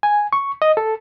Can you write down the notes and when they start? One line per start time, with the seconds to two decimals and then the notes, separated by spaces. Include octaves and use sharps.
0.03 G#5
0.33 C#6
0.62 D#5
0.77 A4